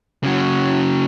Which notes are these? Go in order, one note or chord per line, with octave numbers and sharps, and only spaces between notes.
C#3 F#3